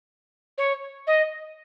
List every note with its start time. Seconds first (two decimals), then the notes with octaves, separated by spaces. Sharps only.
0.58 C#5
1.07 D#5